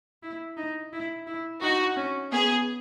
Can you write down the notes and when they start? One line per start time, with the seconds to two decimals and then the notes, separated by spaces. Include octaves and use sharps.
0.23 E4
0.57 D#4
0.92 E4
1.27 E4
1.62 D#4 F#4
1.97 C#4
2.32 B3 G#4